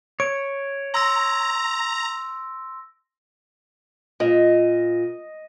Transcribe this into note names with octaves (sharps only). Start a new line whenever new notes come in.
C#5 D7
A#5 C6 E6 A#6
A#2 D#5